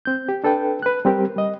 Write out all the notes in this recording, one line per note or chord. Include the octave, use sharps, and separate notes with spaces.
C4 G6
G4
D4 A4 B4 G5
B4 F#6
G3 C4 G4 A#4
G3 D#5